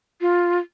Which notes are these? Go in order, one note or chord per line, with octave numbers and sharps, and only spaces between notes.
F4